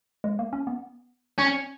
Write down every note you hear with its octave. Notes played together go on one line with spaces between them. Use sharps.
G#3
A#3
C#4
B3
C#4